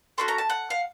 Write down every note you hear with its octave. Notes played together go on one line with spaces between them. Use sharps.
A3 C#4 F#4 C6
A#5
A5
F#5
F5